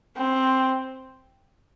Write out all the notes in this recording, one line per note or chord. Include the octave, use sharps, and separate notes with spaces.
C4